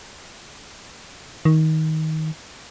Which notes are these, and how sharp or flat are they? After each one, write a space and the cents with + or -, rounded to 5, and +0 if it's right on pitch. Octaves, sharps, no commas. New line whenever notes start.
D#3 +20